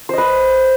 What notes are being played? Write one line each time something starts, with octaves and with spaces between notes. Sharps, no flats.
B4 C5 D#5